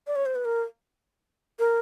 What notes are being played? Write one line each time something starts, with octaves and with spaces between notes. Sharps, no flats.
D5
C#5
C5
B4
A#4
A#4